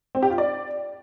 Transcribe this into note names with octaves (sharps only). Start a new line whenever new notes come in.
C4
G4
F4
D5